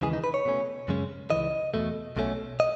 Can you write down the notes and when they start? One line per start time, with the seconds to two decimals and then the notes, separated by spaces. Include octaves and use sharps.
0.02 D#2 C#3 E3 G#3 G#4
0.13 D#4
0.24 B4
0.34 C#5
0.45 B2 A3 C#4
0.88 F#2 C#3 G#3 C#4
1.30 C#3 E3 D#5
1.35 C#2
1.74 E2 B2 A3
2.17 B1 B2 A3 C#4
2.60 D#5